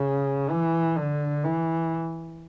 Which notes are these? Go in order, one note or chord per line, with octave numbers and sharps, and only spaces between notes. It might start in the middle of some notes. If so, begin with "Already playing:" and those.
Already playing: C#3
E3
D3
E3